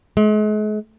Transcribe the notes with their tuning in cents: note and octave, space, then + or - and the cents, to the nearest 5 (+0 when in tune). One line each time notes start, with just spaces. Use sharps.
G#3 +40